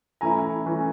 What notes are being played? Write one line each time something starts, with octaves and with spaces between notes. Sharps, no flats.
E3 A3 C#4 E4 G#5 A#5
E3 A3 C#4 E4